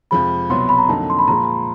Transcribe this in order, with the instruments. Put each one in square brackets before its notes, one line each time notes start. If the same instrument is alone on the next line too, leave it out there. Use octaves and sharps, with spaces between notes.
[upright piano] F2 C3 F3 G#3 [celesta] B5
[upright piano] C2 B2 F#3 B3 [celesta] C6
[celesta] B5
A#5
[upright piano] F2 D3 F#3 A#3 D#4 [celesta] A5
[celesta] C6
B5
[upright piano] A#2 F3 G#3 [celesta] A#5